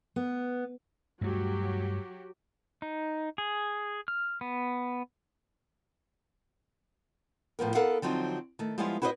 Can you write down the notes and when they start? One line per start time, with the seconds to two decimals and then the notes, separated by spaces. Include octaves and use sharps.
0.16 B3
1.21 G2 F#3 A3 F#4 G4
2.82 D#4
3.38 G#4
4.08 F6
4.41 B3
7.59 A2 F3 B3 A#4
7.75 B3 A4 A#4 F5 F#5
8.02 D3 F3 F#3 C4 D#4
8.59 D#3 A3
8.78 F3 G3 G#3 B3 E4 F4
9.02 E4 F#4 B4 C5 D5 D#5